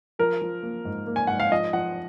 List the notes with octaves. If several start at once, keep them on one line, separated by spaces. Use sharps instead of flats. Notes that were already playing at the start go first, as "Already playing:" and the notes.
F3 A#4
F3
A#3
G#2
A#3
G#5
G#2 F#5
F5
F3 D#5
F3 F#5